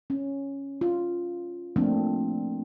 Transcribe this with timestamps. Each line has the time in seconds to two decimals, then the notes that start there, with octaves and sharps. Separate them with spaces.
0.10 C#4
0.81 F4
1.76 F3 A3 A#3 C4 D4